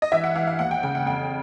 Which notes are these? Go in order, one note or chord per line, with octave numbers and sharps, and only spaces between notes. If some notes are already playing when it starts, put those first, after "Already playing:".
D#5
E3 E5
F#5
E3 F5
F5
D#2 F#5
G5
C#3 G5
F#5
F2 G5